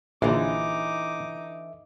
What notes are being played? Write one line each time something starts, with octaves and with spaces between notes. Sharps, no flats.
A#1 D3 E3 D#4 E5 D6